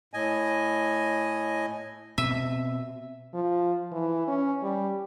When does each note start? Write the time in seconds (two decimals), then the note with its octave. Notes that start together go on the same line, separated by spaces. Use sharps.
0.14 A2 D#5 G#5
2.18 B2 C4 E5
3.34 F3
3.92 E3
4.28 C#4
4.63 G3